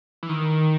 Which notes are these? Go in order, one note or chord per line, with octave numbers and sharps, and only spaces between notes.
E3
D#3